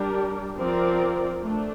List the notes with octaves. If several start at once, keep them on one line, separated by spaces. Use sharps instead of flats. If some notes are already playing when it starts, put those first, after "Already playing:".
Already playing: G3 D4 G4 A#4
F3 C4 F4 A#4 D5
A3 D4